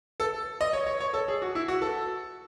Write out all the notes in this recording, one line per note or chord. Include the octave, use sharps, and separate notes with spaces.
A4
D#5
C#5
C#5
C#5
A4
G#4
F#4
E4
F#4
A4